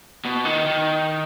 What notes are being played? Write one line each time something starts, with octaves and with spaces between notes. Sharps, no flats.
B2
D#3
D#3